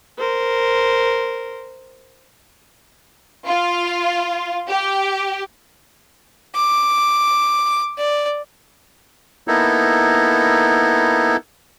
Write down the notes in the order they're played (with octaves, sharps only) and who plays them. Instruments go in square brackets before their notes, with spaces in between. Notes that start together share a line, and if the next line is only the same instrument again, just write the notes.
[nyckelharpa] A#4 C5
[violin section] F4
G4
[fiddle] D6
D5
[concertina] A#3 B3 D#4 E4 A4